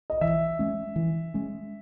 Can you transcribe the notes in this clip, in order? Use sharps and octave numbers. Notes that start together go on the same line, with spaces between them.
D#5
E3 E5
G#3 C#4
E3
G#3 C#4